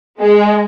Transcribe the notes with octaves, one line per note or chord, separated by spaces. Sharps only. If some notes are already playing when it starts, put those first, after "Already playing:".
G#3